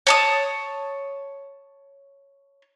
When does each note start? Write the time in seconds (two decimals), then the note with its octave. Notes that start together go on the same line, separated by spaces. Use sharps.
0.07 C#5 A5 D#6